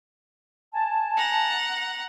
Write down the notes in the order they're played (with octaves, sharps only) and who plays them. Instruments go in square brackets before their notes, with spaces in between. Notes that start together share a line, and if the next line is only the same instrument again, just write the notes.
[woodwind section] G#5 A5
[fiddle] F#5 A#5